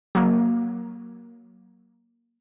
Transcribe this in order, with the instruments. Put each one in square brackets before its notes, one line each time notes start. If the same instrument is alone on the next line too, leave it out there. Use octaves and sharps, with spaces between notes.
[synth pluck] F#3 A#3